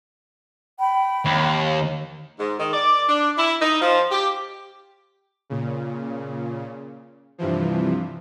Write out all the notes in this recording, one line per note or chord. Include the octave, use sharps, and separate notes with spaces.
G5 B5
D#2
G#2
D#3
D5
D4
E4
D#4
F3
G4
A#2 C#3
G2 C3 E3 F3